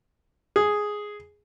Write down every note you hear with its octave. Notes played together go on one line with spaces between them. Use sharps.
G#4